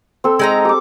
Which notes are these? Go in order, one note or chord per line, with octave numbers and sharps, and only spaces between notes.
C4 A4
G#3 D#4 A#5
G4 D6